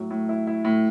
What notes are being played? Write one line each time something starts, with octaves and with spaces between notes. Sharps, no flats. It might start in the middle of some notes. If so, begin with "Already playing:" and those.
Already playing: A2 F#3
A2
E4
E4
A2